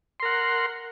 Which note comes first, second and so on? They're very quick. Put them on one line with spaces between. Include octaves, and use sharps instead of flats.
C6 A#4 F#5